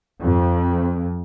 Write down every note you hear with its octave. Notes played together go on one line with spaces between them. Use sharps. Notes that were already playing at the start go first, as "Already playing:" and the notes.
F2